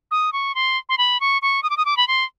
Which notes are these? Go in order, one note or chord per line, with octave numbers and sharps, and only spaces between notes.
D#6
C#6
C6
C6
B5
C#6
C#6
D#6
D6
D#6
D6
B5
C6